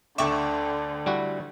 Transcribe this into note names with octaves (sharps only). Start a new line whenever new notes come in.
D2 D3 E5 G5 C#6 D6 E7
G3 E4 F#4